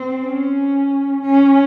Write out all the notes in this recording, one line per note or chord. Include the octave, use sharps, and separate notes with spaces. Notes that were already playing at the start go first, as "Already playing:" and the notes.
Already playing: C4
C#4
C#4